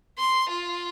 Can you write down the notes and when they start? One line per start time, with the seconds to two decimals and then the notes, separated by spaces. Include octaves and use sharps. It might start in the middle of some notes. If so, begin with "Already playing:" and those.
0.18 C6
0.49 F4